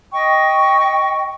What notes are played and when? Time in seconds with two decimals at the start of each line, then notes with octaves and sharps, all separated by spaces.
0.12 D#5 G5 C#6